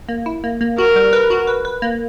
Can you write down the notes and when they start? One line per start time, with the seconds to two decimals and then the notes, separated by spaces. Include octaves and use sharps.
0.09 A#3
0.26 E4
0.44 A#3
0.61 A#3
0.78 F#4 A#4
0.96 G3
1.13 B4
1.30 F#4
1.47 B4
1.65 B4
1.82 A#3